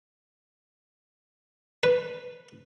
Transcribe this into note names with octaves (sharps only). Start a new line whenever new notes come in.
B4